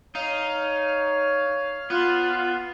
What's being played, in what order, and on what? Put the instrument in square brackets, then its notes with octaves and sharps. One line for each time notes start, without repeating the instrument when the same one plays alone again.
[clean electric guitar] D#4 [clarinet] C#5 [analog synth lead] F5
[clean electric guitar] B3 [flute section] F4